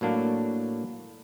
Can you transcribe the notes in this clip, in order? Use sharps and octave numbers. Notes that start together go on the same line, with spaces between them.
A2 F#3 A#3 D4